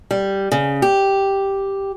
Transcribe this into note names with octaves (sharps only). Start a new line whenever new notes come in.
G3
C#3
G4